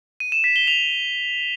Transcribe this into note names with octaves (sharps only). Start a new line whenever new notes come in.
D#7
E7
B6
G7
F7